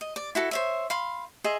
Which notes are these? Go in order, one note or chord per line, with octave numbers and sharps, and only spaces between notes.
D#5
D5
E4 F#4 A4
C5 C#5 E5
F5 B5 C6
G#4 D#5 E5 C6